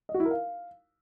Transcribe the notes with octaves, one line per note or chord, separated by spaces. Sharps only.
D#5
F#4
E4
A#4
F5